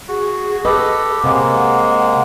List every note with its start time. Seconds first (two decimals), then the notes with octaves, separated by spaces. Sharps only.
0.08 F#4 G#4
0.65 G4 A4 B4 D#5
1.24 C3 G#3 A#3 F#5